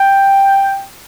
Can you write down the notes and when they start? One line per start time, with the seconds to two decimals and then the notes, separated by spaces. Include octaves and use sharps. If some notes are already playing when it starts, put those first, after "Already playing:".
Already playing: G5